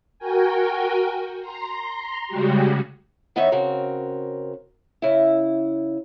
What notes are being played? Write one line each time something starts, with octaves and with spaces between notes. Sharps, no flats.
F#4 A#4 G5 G#5
A#5 C6
C#3 G3 G#3 F#4 G4
D#3 B3 D#4 C#5 E5
C#3 C4 F#4 A#4
C#3 E4